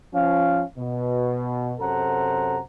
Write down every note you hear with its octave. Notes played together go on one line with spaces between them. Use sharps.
F3 C#4 F5
B2
F#2 C3 A4 C5 F#5 A#5